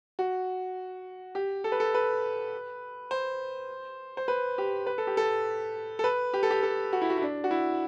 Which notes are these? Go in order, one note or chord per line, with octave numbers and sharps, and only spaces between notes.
F#4
G4
A4
B4
A4
B4
C5
C5
B4
G4
B4
A4
G4
A4
A4
B4
G4
A4
G4
A4
F#4
E4
F#4
E4
D4
F#4
E4